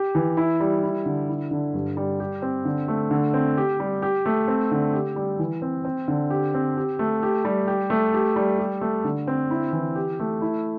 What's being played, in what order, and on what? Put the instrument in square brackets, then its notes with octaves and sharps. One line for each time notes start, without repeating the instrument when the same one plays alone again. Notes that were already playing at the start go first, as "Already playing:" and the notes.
Already playing: [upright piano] G4
E3
E4
G3
E4
D3
E4
D3
G2
G3
G4
C4
D3
A3
D3
C4
G4
G3
G4
A3
C4
D3
G4
G3
E3
C4
C4
D3
G4
C4
G4
A3
G4
G3
G4
A3
G4
G3
G4
A3
D3
C4
E4
E3
G4
A3
E4